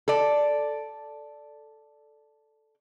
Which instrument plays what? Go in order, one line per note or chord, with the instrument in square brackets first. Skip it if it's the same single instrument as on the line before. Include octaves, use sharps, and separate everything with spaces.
[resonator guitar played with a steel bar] A4 D5